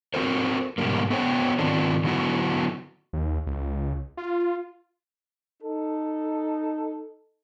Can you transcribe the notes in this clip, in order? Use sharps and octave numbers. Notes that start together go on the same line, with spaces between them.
C4 F#4 A4 A#4 C5
G#2 B2 D3 G3 A#3
B3 A4 C5 C#5 G5
G#2 D#3 C4 D4 F4
D3 F#3 B3 E4 F#4
D#2
C#2
F4
D#4 A4